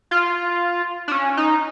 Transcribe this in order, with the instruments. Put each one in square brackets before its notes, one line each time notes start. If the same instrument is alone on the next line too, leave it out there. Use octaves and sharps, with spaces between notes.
[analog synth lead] F4
D4
C#4
D#4